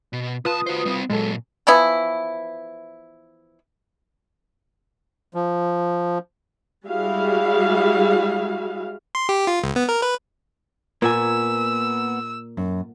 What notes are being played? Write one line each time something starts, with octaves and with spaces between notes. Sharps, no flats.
B2
C2 F4 B4 A5 D#6
F#4 C5
G3 C4
A#2 F#3 G#3 A4
E3 F3 B3 E4
F3
G3 G#3 E4 F#4 G#4 F5
C6
G4
F4
C#2
B3
A#4
B4
A#2 A#3 B3 G#5 E6
F#2